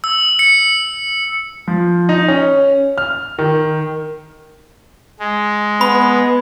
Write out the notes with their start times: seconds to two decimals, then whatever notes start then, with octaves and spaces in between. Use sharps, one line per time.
0.04 E6
0.39 C#7
1.68 F3
2.09 D#4
2.28 C#4
2.98 F6
3.39 D#3
5.19 G#3
5.81 B3 B5